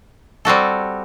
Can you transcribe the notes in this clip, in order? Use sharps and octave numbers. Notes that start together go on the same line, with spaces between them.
G3 C4 F#4 A4